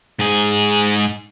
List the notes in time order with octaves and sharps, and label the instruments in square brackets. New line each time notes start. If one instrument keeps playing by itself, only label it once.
[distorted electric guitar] G#2 G#4